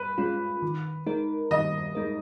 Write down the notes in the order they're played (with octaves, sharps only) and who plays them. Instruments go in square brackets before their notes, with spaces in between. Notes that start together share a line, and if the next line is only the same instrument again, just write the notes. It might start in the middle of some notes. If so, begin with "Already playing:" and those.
Already playing: [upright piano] B4
[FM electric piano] G#3 C#4 F4
D#3
G#3 D#4 A#4
[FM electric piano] D#3 [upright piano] D#5
[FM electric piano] G#3 D#4 A#4